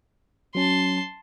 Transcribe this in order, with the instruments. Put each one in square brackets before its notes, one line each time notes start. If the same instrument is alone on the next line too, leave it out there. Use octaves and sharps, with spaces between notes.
[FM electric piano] F#3 C#4 [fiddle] A5 C6